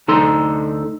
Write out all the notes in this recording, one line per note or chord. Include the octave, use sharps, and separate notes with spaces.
D2 D#4 A4 C6